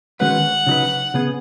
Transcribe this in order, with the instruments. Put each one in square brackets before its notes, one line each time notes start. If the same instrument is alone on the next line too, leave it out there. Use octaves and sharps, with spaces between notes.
[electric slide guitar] D#3 G#3 C#4 F#4 B4 [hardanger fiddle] F#5
[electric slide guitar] C#3 F#3 D#4 B4
C#3 B3 G#4